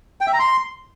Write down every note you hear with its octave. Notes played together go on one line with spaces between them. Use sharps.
G5
E5
A#5
C6